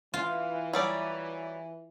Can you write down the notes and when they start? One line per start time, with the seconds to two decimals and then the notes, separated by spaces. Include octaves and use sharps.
0.14 E3 F4
0.73 F#3 G3 D5